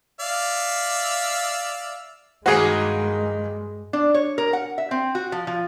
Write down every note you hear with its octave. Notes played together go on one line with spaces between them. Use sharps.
D5 E5 F5
G2 D#3 G#3 A#3 F#4 G#4 B4
D4
C#5
A#4
F#5
E5
C4
F#4
F3
F3